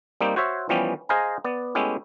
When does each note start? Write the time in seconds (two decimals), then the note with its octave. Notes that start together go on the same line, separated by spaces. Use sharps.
0.21 G3 A#3 C4 D#4 G4
0.36 F#4 C5 C#5 E5
0.69 E3 F3 G3 B3 C#4 G4
1.09 G#4 C5 D#5 F5 G#5 A#5
1.45 B3 D5
1.75 G#3 A3 B3 C#4 E4 G4